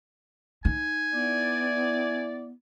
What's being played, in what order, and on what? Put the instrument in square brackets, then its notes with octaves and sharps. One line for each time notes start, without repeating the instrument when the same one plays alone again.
[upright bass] D#4 [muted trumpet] G#5
[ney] B3 [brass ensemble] E4 D5